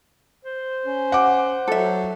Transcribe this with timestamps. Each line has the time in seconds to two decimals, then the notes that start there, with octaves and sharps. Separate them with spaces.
0.45 C5
0.86 C#4
1.12 F#5 D6
1.68 F#3 A4 E5